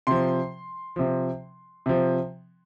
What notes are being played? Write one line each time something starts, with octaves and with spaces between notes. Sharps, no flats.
C3 F3 C6
C3 F3
C3 F3